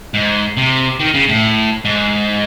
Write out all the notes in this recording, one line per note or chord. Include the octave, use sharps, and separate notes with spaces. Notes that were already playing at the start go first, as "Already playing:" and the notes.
G#2
C3
D#3
C#3
A2
G#2